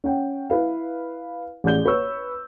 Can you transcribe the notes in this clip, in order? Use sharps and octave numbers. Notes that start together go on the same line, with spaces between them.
C#4 F#5 G5
E4 B4 F5
A1 G#4 D5 G6 G7
B4 C#5 C#6 E6